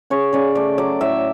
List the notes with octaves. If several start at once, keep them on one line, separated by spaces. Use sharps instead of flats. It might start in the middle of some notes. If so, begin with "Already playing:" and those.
C#3 C#5
C#3 D5
A3 D5
F#3 D5
A2 E5